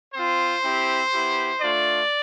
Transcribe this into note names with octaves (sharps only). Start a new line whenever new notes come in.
C4 F4 C5
C4 E4 G4
B3 E4 G4
A3 D4 F4 D5